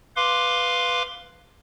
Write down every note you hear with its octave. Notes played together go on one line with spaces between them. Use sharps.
B4 F5 C6 D6